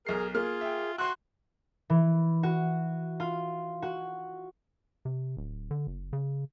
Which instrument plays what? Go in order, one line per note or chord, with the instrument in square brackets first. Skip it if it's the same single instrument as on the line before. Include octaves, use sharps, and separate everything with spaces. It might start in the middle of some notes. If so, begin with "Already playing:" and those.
[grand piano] B1 C7 [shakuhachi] G#4 [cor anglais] A#4
[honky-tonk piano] A#3 [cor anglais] F4 [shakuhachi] G#4 [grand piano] F6
[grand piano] E5 G5
[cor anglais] F#4 [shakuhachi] C6 [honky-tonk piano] F#6
[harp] E3
F#4
F4
F#4
[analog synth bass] C3
D1
D3
F#1
C#3